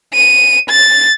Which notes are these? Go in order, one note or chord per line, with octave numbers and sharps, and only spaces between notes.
D#7
A6